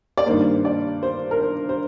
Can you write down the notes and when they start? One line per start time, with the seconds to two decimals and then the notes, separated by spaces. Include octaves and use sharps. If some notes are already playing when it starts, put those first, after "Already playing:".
0.17 D5
0.26 G2 D#3 A#3 C5
0.65 D5
1.03 C5
1.31 A#4
1.41 C5
1.69 C5